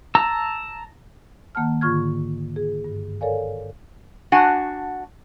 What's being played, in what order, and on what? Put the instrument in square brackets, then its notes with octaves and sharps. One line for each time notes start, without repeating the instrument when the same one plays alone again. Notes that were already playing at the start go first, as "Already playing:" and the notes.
[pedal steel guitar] A5 A#5 E6
[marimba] D#3 A#3 F#5 A5 F6
G#2 D3 F4 C#6 F6 G#6
G#4
G2
A4 A#4 C#5 D5 F5 G#5
[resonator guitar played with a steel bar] D4 F#4 F#5 G#5